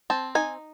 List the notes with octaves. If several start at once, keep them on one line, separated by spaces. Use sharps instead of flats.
C4 A5
D#4 G#5